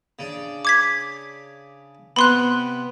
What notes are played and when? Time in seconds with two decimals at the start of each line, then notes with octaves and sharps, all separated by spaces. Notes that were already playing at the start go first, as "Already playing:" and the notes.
0.19 C#3 D4
0.65 D6 G#6 B6
2.16 C3 B3 B5 C6 F#6